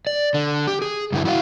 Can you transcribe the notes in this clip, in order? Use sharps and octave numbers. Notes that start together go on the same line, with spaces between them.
D5
D3
G4
G#4
G2 D3 E4
E4 F#4 C#5 F5